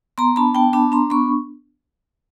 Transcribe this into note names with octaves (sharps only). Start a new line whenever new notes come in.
B3 A#5 C6
D4 A5 B5
B3 G5 A5
D4 A5 B5
D4 A#5 C6
B3 B5 C#6